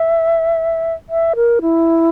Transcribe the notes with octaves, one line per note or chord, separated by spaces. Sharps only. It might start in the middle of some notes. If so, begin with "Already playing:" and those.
Already playing: E5
E5
A#4
E4